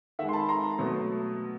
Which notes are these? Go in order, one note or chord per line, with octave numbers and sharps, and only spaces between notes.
D#3 G#3 E5 F#5
C6
A5 B5
A#5 C6
B2 F#3 A3